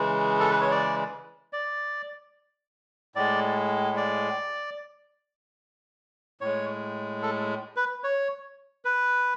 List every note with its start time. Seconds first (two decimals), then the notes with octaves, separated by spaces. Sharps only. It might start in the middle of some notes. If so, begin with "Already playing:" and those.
Already playing: C#3 E3 G#3
0.40 A4
0.50 B4
0.61 C#5
0.71 D5
1.53 D5
3.15 A2 G#3 D5
3.97 D5
6.41 A2 G#3 C#5
7.23 A4
7.76 B4
8.04 C#5
8.85 B4